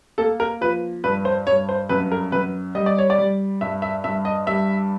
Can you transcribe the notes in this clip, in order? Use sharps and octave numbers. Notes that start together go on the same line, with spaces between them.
A#3 A4
A#4
F3 B4
G2 B4
C5
G2 C#5
C5
F#2 B4
A#4
F#2 B4
G3 D#5
D5
C#5
D5
G3
G2 E5
E5
G2 E5
D#5
G3 E5